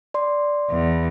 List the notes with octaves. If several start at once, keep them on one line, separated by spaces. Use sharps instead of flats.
D5 C6
E2